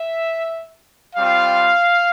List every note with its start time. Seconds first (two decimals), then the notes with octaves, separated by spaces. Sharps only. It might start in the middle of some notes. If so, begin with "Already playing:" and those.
Already playing: E5
1.16 G3 C4 F4 F5